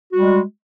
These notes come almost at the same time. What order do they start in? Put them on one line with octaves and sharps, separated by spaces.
F#4 G3 G#3